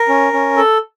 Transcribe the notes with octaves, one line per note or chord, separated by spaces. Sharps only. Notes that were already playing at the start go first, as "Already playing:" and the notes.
Already playing: A#4
C#4
C#4
A4